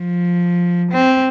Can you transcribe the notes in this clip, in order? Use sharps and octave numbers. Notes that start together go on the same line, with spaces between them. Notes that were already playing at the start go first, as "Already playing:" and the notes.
Already playing: F3
C4